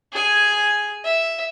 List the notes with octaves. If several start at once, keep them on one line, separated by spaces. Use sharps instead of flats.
G#4 G#5
E5